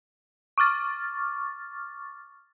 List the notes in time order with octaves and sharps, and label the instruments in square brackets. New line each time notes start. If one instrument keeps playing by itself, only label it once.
[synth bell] C#6 D6 F6 A6